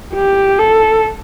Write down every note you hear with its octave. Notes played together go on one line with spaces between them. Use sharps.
G4
A4